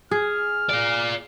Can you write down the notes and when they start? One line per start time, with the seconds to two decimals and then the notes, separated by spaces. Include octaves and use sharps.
0.11 G#4 F6
0.69 F4 D5